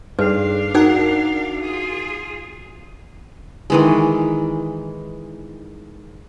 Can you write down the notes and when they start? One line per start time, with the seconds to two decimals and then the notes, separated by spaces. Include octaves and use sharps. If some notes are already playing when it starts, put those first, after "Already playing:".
0.19 G2 D4 D#4 G#4 B4 F5
0.74 D#4 F#4 A#4 F#5
1.62 F4 G#4
3.70 D#3 E3 G#3